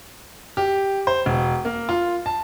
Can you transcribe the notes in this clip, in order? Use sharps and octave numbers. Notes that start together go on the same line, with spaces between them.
G4
C5
E1
A#3
F4
A5